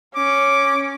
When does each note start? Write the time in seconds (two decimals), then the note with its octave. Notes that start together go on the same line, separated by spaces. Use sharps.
0.16 C#4 D6